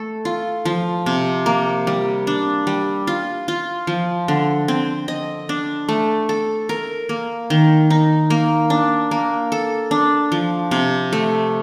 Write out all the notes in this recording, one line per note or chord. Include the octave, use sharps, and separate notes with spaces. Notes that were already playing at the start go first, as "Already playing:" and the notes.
Already playing: A3 A4
F4
F3
C3
A#3
G3
D4
G3
F4
F4
F3
D3
C4
D#5
D4
A3
A4
A#4
A#3
D#3
D#4
A#3
D4
A#3
A4
D4
F3
C3
A3